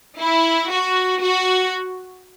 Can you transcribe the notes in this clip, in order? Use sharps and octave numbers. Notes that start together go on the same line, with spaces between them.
E4
F#4
F#4